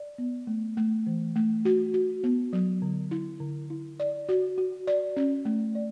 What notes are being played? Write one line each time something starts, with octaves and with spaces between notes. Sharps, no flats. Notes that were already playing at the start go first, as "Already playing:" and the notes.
Already playing: D5
B3
A3
A3
E3
A3
F#4
F#4
B3
F#3
D3
E4
D3
E4
D5
F#4
F#4
D5
C#4
A3
D5